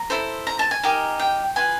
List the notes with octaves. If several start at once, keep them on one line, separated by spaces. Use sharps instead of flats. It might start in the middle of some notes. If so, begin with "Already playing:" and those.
Already playing: A#5
E4 A4 C5
A#5
A5
G#5
D#4 G4 A#4
G5
F4 G#4 B4 G#5